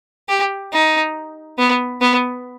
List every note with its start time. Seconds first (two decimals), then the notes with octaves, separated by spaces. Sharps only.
0.28 G4
0.72 D#4
1.59 B3
2.01 B3